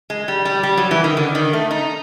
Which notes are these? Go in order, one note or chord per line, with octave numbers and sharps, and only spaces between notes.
G#3
G3
G3
G3
F#3
E3
D#3
D3
D#3
A3
D#4